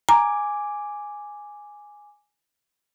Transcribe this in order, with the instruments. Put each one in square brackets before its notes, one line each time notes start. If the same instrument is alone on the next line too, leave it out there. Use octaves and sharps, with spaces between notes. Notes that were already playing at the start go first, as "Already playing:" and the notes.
[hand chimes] G#5 D6 [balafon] A#5